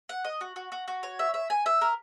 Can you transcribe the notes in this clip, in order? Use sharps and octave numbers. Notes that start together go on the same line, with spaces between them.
F#5
D#5
F#4
F#4
F#4
F#4
C#5
E5
E5
G#5
E5
A#4